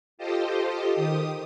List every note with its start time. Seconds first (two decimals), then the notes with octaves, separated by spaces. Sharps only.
0.18 F4 G4 A4 C5 D#5
0.92 D#3 G4 D#6